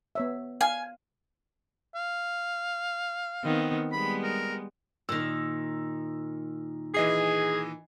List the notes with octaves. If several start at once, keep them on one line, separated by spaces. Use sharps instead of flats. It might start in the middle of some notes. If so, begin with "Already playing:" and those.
B3 C#5 E5
F5 G#5
F5
D#3 B3 C4
G3 G#3 B3 B5
A#4
A#2 D#3 E6
E3 G#4 D#5 C7